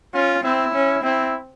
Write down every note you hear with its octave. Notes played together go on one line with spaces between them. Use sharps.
C#4 F4
C4 E4
C#4
C4 E4